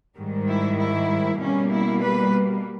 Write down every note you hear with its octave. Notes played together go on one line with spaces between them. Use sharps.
G#2 D#3 G3
E4
E4
B2 G3 A#3 C#4
E4
B4